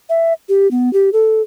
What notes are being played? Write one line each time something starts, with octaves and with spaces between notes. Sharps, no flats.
E5
G4
B3
G4
A4